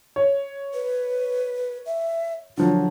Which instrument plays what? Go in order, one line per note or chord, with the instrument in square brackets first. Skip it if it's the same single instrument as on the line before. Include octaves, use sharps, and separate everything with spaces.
[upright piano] C#5
[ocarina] B4
E5
[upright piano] D3 F3 F#3 [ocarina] F4